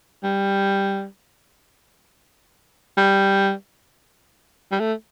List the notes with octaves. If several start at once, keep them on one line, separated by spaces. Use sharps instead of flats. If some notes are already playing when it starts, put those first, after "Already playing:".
G3
G3
G3
A3